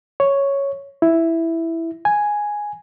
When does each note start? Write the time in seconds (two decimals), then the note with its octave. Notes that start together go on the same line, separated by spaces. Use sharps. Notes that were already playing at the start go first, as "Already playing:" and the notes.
0.20 C#5
1.02 E4
2.05 G#5